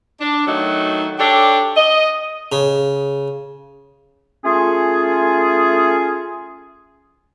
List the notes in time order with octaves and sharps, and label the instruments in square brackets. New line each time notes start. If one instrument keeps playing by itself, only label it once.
[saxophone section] D4
D#3 F#3 A3 D#4
D4 G4 A4 C#5
D#5
[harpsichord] C#3
[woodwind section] A3 C#4 F4 G#4